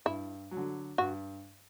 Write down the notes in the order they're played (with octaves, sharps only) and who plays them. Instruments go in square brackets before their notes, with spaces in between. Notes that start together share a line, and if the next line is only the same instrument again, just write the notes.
[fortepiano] G2 [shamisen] E4
[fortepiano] F#3
D3
[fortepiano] G2 [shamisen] F#4